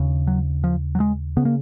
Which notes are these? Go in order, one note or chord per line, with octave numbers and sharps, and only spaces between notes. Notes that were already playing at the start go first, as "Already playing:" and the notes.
Already playing: D#2 C#3
F#3
F3
F#3
G#3
C#3 B3
A#3